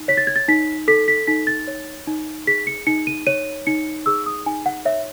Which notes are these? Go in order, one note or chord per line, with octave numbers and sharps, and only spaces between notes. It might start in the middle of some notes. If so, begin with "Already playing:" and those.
Already playing: D#4
C#5 B6
A6
G#6
A6
D#4 B6
A4 B6
B6
D#4 B6
A6
C#5
D#4
G#4 B6
C#7
D#4 C#7
D#7
C#5 D#7
D#4 C#7
G#4 E6
D#6
D#4 G#5
F#5
C#5 E5